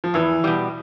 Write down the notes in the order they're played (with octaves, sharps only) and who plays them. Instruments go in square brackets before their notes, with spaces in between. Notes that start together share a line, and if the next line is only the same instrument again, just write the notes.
[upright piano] F3
[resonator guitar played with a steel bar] E2 [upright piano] E3
[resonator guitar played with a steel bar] B2 G3